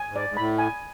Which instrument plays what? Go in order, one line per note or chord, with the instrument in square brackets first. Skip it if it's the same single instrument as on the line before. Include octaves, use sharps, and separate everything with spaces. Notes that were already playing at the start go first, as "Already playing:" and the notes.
Already playing: [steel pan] G#5
[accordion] G#2
[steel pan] D5
[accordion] G#2
[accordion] A2 [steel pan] B5
[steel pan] G#5